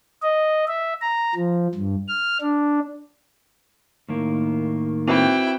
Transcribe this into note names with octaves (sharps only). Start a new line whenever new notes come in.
D#5
E5
A#5
F3
G2
F6
D4
A2 D#3 A#3
C4 E4 F#4 B4 G5